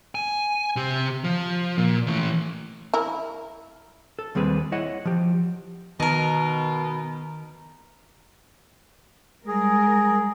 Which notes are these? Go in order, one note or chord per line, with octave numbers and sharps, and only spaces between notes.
G#5
C3 G4
F3
A#2
E3 A3
E4 A#4
A4
D#2 G3 C4 G#4 B4
E4 C#5 D#5 F#5
F3 G4
B2 D#3 D#4 A#4
G3 G#3 G#4 A#4